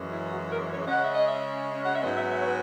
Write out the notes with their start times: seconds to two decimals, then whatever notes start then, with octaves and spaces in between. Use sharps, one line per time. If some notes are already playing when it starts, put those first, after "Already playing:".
Already playing: F#2 E3 G#3 C#4
0.12 E4
0.31 F#4
0.50 A#4
0.69 C#5
0.88 C#3 G#3 C#4 F#5
1.01 E5
1.13 D#5
1.27 E5
1.84 F#5
1.94 E5
2.03 G#2 F#3 B3 D#5
2.17 E5
2.32 E5
2.40 C#5
2.46 B4